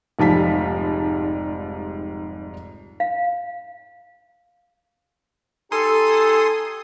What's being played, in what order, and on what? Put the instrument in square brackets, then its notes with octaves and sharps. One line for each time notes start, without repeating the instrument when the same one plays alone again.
[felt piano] F1 G#2 F3 G3 A5 B6
[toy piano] F5
[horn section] D#4 G4 A4 [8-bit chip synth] G#5 C6 D#6